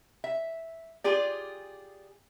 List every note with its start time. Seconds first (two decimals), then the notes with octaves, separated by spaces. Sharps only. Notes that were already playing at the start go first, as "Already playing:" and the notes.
0.24 E5
1.04 F4 G4 G#4 D5